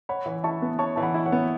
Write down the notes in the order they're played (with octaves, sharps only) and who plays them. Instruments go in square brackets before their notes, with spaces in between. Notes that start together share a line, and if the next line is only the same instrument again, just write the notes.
[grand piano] C#5 [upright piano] F#5 B5
[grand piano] E3
[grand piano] E4 [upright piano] A5 C#6
[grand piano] B3
[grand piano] C#5 [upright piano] A5 C#6
[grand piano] E3 [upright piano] A5
[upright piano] F#5 B5
[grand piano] E4
[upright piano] C#5 F#5
[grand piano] B3